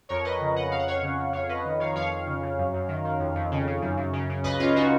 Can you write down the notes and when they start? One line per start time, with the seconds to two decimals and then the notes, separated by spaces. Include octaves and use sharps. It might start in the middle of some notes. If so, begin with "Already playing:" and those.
0.09 F2 A#4 C#5
0.25 F2 B4 D#5
0.40 C#3
0.56 C#3 D#5 F#5
0.71 F2 F5
0.79 F#5
0.87 F2 C#5 F5
1.02 C#3
1.18 C#3
1.33 F2 C#5 F5
1.49 F2 B4 D#5
1.65 D#3
1.80 D#3 C#5 F5
1.96 F2 C#5 F5
2.11 F2
2.27 C#3
2.43 C#3
2.58 F#2
2.73 F#2
2.88 D#3
3.05 D#3
3.20 F2
3.35 F2
3.51 C#3
3.67 C#3
3.82 F#2
3.97 F#2
4.13 C#3
4.29 C#3
4.44 C#2 B4 D#5
4.60 C#2 C#4 F4
4.76 C#3 D#4 F#4